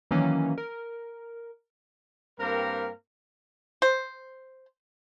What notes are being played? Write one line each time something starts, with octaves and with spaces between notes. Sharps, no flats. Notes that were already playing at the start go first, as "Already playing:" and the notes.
D#3 E3 F#3 A#3 C#4
A#4
G2 A#3 C4 A#4
C5